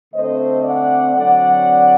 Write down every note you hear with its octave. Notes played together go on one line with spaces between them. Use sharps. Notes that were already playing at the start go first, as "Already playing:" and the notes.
D3 A3 C4 C5 D#5
D5 F#5
D3 F#3 C4 D5 F#5